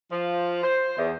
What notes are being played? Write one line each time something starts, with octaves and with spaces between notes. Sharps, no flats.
F3
C5
E2